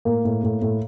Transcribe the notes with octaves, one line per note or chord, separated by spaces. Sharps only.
A2 A#3
A2
A2
A2